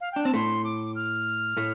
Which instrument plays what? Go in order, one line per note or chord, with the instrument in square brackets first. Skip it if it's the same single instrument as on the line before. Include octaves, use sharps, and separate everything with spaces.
[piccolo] F5
[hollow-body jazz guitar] D4 [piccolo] G5
[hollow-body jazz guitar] C4 [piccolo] A5
[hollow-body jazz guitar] A2 A3 [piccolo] C6
[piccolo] D6
F6
[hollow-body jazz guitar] A2 A3